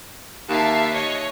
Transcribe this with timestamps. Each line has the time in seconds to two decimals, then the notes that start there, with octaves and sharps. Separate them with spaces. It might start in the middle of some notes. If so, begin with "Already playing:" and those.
0.49 D#2 E5 F5 A5
0.93 C#5 D#5